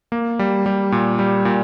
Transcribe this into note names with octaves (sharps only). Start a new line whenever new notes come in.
A#3
G3
G3
A#2
G3
A#2